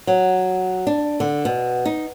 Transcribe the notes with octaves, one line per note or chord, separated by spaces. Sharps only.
F#3
D4
D3
B2
D#4